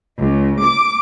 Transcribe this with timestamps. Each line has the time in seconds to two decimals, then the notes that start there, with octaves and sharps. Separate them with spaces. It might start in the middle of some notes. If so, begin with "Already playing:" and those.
0.18 C#2
0.62 D6